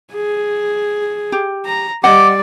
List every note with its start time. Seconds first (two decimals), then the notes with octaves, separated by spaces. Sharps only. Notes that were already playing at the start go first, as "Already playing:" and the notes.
0.14 G#4
1.32 G4
1.66 A#5
2.04 G3 D5 D#5 F#5 D6